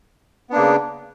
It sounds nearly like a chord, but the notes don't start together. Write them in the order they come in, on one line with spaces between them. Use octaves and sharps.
B3 D4 A#3 C#3